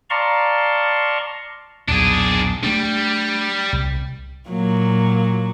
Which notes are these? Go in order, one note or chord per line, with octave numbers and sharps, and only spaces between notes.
D5 F5 A5 A#5 C6 C#6
B1 E2 A#2 D4 G#4
G3 A3 D4
C2
A#2 F#3 A#3